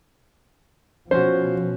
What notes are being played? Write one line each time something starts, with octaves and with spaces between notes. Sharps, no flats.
B2 F3 C#4 F#4 C5